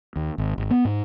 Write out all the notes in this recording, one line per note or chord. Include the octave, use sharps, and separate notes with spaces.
D#2
G#1
G#1
B3
G#2